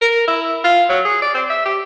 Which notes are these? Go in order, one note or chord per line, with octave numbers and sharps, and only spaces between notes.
A#4
E4
F4
F#3
G#4
D5
C4
E5
G4